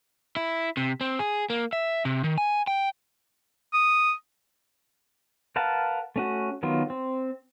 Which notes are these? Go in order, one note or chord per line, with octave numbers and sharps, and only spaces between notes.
E4
C3
C4
G#4
A#3
E5
C3
D#3
G#5
G5
D#6
A#4 B4 F5 F#5 A5
A3 C#4 F#4
D#3 F#3 B3 F4
C4